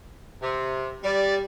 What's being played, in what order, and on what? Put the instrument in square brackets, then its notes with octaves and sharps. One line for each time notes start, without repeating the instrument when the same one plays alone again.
[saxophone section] C3
[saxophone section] G3 [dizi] D5